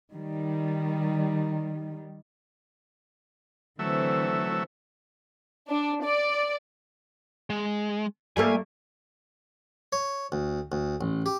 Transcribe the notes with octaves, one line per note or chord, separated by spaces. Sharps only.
D#3 G3
D3 E3 F#3 A3 C4 E5
D4
D5
G#3
G3 A3 A#3 G#5
C#5
D2
D2
A1
G4